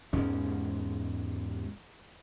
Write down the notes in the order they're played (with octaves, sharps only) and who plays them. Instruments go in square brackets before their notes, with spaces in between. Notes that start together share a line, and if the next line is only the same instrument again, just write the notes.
[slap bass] E2 G#2 G#3 C#4